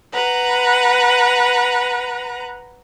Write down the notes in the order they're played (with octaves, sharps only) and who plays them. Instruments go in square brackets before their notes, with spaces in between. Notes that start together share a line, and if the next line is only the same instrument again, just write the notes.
[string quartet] B4 F#5 A#5